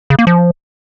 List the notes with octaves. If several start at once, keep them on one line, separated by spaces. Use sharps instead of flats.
C#3
A#3
F3